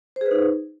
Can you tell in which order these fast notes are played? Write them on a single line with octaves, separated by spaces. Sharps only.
C5 G#4 B4 D#4